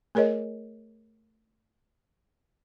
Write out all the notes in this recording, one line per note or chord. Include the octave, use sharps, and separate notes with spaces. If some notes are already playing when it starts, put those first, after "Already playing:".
A3 G#4 A#4 C#5 D#5